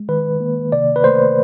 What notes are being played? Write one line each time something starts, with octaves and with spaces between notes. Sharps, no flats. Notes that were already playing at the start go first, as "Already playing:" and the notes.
Already playing: G#3
D#3 B4
A#3
C3 D5
B4
A3 C5